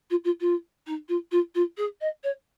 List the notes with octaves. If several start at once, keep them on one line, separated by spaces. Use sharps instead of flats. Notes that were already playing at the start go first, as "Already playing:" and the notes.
F4
F4
F4
D#4
F4
F4
F4
G#4
D#5
C#5